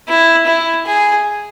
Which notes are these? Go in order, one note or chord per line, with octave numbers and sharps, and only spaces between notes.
E4
E4
G#4